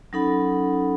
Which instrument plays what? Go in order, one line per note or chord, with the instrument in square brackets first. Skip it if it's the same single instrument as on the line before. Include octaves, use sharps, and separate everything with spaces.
[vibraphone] F#3 C#4 D#4 A4 F#5 B5